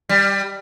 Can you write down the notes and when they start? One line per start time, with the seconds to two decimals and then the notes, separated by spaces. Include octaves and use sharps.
0.09 G3